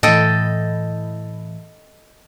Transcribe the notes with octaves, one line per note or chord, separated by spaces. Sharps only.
A2 E3 A4 D#5 G5